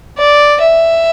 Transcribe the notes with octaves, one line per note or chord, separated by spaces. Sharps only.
D5
E5